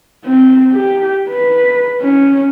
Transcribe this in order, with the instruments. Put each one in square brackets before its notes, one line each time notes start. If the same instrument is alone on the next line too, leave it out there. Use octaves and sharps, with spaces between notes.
[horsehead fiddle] C4
G4
B4
C#4